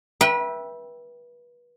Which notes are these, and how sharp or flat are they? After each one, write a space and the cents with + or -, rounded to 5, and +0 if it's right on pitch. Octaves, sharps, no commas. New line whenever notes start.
B4 -30 E5 +0 G5 +0